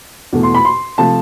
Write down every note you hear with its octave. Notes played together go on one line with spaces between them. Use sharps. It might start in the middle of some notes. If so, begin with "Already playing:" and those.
E2 B2 A3
C6
B5
C6
C3 F3 A3 A5